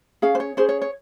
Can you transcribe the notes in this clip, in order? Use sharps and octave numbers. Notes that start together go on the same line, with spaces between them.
C#4 G#4 F5
C5
C#5
C#4 G#4 C5
C#5
C#5